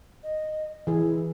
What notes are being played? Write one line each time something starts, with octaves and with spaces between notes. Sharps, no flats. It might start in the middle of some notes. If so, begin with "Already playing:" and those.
D#5
E3 E4 G#4